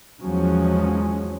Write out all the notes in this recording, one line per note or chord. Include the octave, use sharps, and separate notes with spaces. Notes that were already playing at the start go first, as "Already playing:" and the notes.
E2 F3 F#3 G#3 C#4